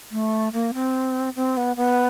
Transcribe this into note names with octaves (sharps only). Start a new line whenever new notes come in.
A3
A#3
C4
C4
B3
B3